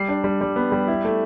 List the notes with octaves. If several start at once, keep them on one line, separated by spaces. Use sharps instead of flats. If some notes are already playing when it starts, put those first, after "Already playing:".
Already playing: G3 C7
D4
G3
G3
B3
G3
E4
A3